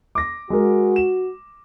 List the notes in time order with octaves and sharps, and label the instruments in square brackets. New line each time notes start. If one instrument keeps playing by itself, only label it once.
[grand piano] D6 A#6
[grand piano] G#3 A#4 [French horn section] F#4
[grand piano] E7